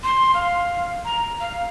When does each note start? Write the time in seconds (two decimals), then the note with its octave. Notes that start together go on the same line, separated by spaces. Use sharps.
0.03 C6
0.34 F5
1.05 A#5
1.40 F5